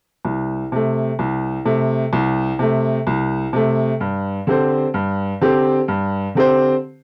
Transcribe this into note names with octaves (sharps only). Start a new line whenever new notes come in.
C2
C3 A3
C2
C3 A3
C2
C3 A3
C2
C3 A3
G2
D3 C4 G4 C5
G2
D3 C4 G4 C5
G2
D3 C4 G4 C5